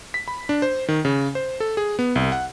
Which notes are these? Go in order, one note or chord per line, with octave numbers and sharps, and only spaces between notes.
B6
B5
D4
C5
D#3
C#3
C5
A4
G#4
B3
C2
F#5